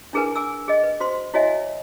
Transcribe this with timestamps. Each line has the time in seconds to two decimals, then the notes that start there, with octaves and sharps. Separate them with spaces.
0.13 D4 E4 G#4 A#4 B4 G#5
0.35 G#5 D6 E6
0.68 G#4 D#5
0.83 B4
1.00 F#4 C5 C6
1.34 E4 F#4 C#5 D#5 E5 G#5